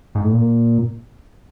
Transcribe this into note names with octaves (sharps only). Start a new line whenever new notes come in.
G#2
A2
A#2